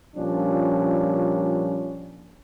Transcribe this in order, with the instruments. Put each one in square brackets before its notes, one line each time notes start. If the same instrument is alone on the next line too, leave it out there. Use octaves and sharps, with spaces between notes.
[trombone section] A#2 F3 G3 C#4 D4